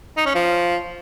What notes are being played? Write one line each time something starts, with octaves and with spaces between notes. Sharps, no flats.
D#4
C#4
F3